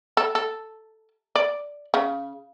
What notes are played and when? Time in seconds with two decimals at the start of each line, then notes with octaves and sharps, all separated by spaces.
0.17 A4
0.35 A4
1.36 D5
1.94 C#3